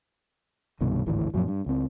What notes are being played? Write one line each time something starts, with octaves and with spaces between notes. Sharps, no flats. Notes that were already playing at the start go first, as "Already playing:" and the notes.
C2 G2 B2 D#3
G#1 D2 A2 E3
F#2 A#2 F3 F#3
G2
C#2 C4